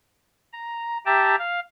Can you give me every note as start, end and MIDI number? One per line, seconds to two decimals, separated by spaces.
0.53 0.98 82
1.06 1.36 67
1.06 1.36 76
1.06 1.36 79
1.06 1.36 81
1.06 1.36 82
1.39 1.60 77